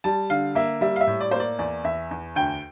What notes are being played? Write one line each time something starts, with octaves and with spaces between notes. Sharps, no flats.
G3 A5
D3 F5
A#3 E5
G3 E5
F5
E5
A2
D5
A#3 C5
D5
E2 D5
E2 E5
E2
D2 G5